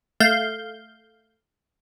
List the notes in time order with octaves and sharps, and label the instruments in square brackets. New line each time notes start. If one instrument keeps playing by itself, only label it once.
[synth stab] A3 F5 G6